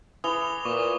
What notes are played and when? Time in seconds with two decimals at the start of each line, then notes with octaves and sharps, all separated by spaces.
0.24 E3 D#6 F7 G7
0.65 A#2 C#6 D6